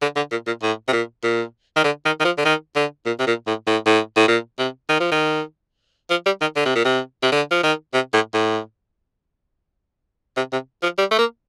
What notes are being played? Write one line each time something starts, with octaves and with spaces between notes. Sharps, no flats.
D3
D3
A#2
A#2
A2
C3
A#2
A#2
D#3
D3
D#3
D#3
F3
D3
D#3
D3
A#2
C3
A#2
A2
A2
A2
A2
A#2
C3
D#3
F3
D#3
F3
G3
D#3
D3
C3
A#2
C3
C3
D3
F3
D#3
C3
A2
A2
C3
C3
F3
G3
A3
A#3